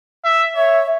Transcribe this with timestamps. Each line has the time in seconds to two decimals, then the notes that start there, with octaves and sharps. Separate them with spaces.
0.25 E5
0.57 C#5 E5